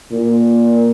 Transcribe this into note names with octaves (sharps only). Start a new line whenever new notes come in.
A#2